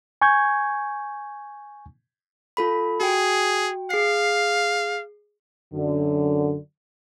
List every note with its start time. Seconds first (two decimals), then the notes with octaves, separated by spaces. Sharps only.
0.22 G#5 C#6 G6 G#6
2.57 F4 A4 B5
3.00 F#4 G#4 G5
3.90 G#4 F5 C7
5.74 F#2 D3